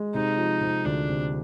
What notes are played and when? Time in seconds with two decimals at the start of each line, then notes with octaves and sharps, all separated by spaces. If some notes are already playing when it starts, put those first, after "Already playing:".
Already playing: G#3
0.14 C3 D#4
0.37 F3
0.61 C3
0.85 D2 D4
1.08 C3